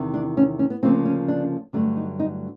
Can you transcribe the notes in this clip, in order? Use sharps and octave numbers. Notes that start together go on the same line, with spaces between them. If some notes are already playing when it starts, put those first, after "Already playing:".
Already playing: E2 C3 D#3
D4
C#4
C#4
B3
D2 C#3 F3 A#3 C4
C#4
D4
G2 D3 F#3 A3 D4
D#4
D#4